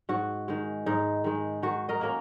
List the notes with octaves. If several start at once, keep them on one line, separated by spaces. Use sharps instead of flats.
G#2 F#4
D#3 G#3
G#2 D#4
D#3 G#3
D#3 F#4
A#4 D#5
A#3 C#4 A#4